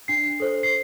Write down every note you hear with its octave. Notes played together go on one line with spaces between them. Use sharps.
D4 C7
A4 C5
C7